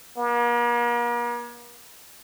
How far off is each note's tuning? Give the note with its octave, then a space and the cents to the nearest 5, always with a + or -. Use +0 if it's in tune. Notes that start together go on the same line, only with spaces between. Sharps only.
A#3 +45